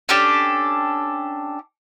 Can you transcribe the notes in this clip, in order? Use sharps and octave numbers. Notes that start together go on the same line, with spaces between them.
C#4 D4 G4 A4